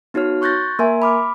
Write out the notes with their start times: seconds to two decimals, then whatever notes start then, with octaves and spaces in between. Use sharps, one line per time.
0.14 B3 D#4 F#4 C#5 F6
0.41 C6 C#6 F#6 G6 A6 A#6
0.79 A#3 A#4 E5 G#5
1.02 B5 D6 F6